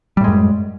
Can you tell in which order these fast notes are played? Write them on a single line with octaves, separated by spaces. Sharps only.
G3 A2 G#3 F#2